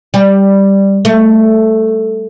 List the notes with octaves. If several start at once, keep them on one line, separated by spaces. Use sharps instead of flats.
G3
A3